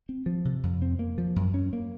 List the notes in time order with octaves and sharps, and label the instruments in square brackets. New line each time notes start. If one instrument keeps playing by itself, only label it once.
[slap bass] C4
F3
C3
F2
C4
A#3
F3
F#2
C#4
A#3